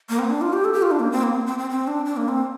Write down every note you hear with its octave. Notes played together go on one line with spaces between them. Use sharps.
A#3
C4
D4
F4
G4
A4
G4
F4
D4
A#3
C4
A#3
C4
C4
C4
C4
D4
D4
A#3
C4